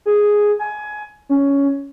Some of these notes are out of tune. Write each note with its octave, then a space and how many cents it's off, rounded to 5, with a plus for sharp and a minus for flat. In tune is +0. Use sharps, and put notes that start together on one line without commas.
G#4 +0
G#5 +20
C#4 +10